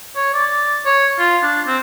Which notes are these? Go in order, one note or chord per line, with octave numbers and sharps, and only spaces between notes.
C#5
D5
C#5
F4
D4
C4